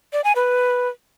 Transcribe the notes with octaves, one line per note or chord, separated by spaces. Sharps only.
D5
G#5
B4